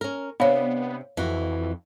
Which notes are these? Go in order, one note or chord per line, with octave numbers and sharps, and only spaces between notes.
C#4 A#4
C3 B3 D4 C#5 F5 B5
F2 E3 F#4